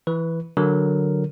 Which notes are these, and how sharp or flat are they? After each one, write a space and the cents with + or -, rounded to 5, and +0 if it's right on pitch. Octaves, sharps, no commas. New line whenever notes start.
E3 +0 B4 +0
D3 +0 F#3 +0 A#4 +0